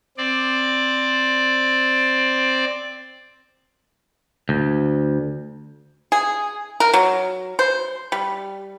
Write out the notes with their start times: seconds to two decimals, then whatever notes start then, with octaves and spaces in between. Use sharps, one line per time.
0.18 C4 D5
4.49 D2
6.12 G#4
6.80 A#4
6.94 F#3
7.59 C5
8.12 G3